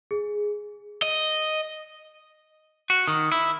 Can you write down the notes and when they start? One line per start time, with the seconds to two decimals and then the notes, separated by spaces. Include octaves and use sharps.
0.11 G#4
1.02 D#5
2.90 F#4
3.07 D#3
3.32 E4